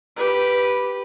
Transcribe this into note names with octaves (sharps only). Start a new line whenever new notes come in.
G4 B4